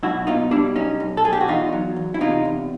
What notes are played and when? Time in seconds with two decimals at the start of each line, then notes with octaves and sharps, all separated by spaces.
0.03 B1 E4 F#4
0.27 B2 D#4 F4
0.51 G3 D4 E4
0.75 B1 C#4 D#4
1.00 B1
1.17 A4
1.24 B1 G#4
1.33 G4
1.41 F#4
1.48 E2 D#4 F4
1.73 F#3
1.96 E2
2.14 E4
2.21 C3 D#4 F4
2.45 E2